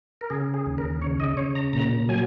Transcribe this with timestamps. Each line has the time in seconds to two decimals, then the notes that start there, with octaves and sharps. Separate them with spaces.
0.21 A#4
0.30 C#3 G#4
0.54 G#4
0.66 D#2
0.78 A#4
1.02 C#3 C#5
1.20 D#5
1.37 C#3 C#5
1.55 A#5
1.73 A#2 A#5
2.09 F#3 G#5